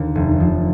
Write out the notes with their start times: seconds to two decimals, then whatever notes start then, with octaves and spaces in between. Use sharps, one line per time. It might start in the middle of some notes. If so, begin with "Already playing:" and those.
Already playing: D#2 D3
0.15 F1
0.40 F3